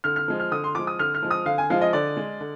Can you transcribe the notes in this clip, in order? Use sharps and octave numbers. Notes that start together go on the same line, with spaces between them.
D3 F6
F6
F3 G#3
F6
D3 D#6
C6
F3 G#3 D6
D#6
D3 F6
F6
F3 G#3
D#6
D3 F5
G#5
F3 G#3 F5
D#5
D3 D5
G#3
D3